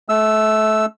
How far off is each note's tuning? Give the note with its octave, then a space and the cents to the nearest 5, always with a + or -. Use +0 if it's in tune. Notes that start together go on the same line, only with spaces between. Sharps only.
A3 -25 E6 +0